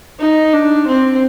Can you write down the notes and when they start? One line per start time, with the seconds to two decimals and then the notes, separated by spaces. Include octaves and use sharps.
0.19 D#4
0.53 D4
0.87 C4